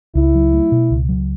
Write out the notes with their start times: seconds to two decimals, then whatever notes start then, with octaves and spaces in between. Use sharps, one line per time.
0.15 C#2 E4
0.35 F#3
0.53 A3
0.72 B2
0.91 C#2
1.09 F#3